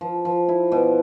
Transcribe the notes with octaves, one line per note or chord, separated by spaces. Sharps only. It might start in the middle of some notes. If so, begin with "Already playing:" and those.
F3
F3
E4
B2